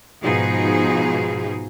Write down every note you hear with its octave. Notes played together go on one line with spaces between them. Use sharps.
G#2 B2 F3 D#4 G#4